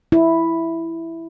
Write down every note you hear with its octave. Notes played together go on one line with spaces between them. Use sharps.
E4